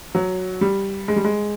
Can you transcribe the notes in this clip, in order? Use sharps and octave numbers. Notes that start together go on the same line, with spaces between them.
F#3
G3
G#3
G3
G#3